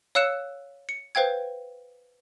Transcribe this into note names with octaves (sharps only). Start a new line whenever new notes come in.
C#5 F5 E6 F#6 C#7 E7
C#7
B4 C5 F5 G5 G#6